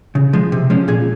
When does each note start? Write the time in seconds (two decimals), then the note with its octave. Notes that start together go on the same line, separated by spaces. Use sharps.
0.15 C#3
0.33 F3 G#3
0.52 C3
0.70 F3 G#3 C#4
0.88 A#2 G#4